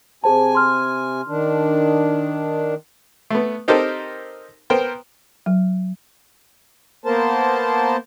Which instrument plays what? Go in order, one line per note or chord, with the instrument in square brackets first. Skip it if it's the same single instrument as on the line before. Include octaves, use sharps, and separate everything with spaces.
[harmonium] C3 G#5 [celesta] G#4 C5 A5
[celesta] C6 F6
[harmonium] D#3 D4
[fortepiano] A3 B3
C4 D#4 G4 A4 A#4 C5
B3 A#4 C5 G5
[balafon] F#3
[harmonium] A#3 B3 A#4 C5 A5